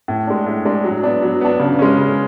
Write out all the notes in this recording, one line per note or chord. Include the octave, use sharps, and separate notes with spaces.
A2
G#3 D4
A2
G#3 D4
F#3
B3 D4
F#3
B3 D4
C#3
G#3 C#4
C#3